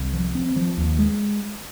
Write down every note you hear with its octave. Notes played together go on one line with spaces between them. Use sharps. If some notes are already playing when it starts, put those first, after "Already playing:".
Already playing: C2
F3
C4
F3
D#2
G#3